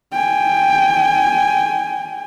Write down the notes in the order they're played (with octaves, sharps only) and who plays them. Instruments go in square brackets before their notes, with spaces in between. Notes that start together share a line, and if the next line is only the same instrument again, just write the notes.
[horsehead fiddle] G5 G#5